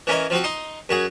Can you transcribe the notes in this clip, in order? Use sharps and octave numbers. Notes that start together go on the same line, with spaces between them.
E3 C#4 A#4 D#5
F3 C4 F#4
D#4 C6 D#6
F#2 F#4 G#4